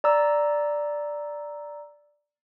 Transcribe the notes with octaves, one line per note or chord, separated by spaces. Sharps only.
D5 A#5 E6